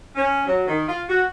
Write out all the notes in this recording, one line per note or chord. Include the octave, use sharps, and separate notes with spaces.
C#4
F#3
D#3
F4
F#4